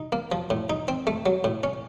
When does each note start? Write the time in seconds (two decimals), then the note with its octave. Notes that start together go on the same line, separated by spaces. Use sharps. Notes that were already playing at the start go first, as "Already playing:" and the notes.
Already playing: D#4
0.12 A#3
0.32 F3
0.50 A2
0.70 D#4
0.88 C4
1.07 A3
1.26 F#3
1.44 A2
1.63 C#4